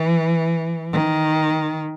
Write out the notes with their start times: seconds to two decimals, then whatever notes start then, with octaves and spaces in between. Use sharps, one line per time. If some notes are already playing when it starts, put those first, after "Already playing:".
Already playing: E3
0.93 D#3